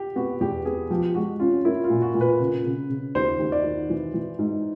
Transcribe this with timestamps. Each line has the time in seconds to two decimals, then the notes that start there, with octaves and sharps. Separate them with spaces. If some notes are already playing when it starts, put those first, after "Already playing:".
Already playing: G4
0.16 B3 F#4
0.40 E2 G4
0.65 B3 G#4
0.90 F3 G4
1.15 G#3 F#4
1.40 C#4 F4
1.65 A#3 E4
1.84 F4
1.90 A#2
2.02 F#4
2.14 A#2
2.21 B4
2.40 C#3
2.64 C#3
2.90 C#3
3.15 D#2 C5
3.39 D#2
3.52 D5
3.64 D#3
3.90 E3
4.14 E3
4.39 G#2